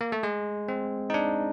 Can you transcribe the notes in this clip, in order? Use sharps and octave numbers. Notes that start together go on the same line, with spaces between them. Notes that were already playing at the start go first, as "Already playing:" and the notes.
A#3
A3
G#3
C4
D#4
D4